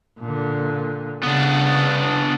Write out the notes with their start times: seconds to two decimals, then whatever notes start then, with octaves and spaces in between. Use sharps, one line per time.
0.20 A#2 D3
1.23 C#3 B3 D4